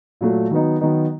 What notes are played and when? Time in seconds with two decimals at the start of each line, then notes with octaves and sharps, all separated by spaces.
0.21 A#2 F#3 A3
0.51 D#3 F#3 B3 D#4
0.81 D#3 F#3 B3 D#4